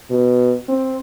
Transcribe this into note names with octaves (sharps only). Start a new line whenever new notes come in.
B2
C4